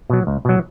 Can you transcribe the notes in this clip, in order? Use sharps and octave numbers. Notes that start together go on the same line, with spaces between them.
B2 F#3
C#2
B2 F#3